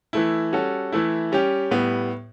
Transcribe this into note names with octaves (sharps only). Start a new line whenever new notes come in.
E3 A3 E4
G3 C#4 F#4 A4
E3 A3 E4
G3 C#4 G4
A2 G3 B3